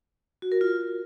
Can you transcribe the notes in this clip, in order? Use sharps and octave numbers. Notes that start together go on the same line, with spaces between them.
F#4
A#4
F4